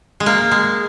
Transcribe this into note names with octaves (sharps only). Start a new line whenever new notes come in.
G#3
A#3
G#3